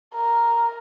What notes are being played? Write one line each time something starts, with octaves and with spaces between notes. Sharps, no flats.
A#4